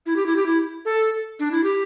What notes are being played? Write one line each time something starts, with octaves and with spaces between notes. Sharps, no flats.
E4
G4
E4
G4
E4
A4
D4
E4
G4